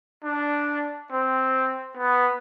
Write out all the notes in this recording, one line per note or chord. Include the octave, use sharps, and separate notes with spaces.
D4
C4
B3